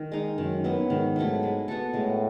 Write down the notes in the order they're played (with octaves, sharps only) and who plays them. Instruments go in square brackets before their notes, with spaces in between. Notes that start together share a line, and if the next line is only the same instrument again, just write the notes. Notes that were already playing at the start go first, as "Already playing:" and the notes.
Already playing: [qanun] D#3
G#3 D#4
[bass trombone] F#2 [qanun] D#3
[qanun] F#3 B3 E4
[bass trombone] G#2 [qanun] D#3
[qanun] F#3 A3 E4
G#3
B3 F#4 A4
[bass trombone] A2 [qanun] G#3